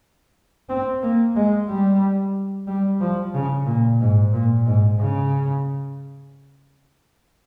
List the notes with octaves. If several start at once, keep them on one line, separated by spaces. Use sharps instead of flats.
C4
A#3
G#3
G3
G3
F3
C#3
A#2
G#2
A#2
G#2
C#3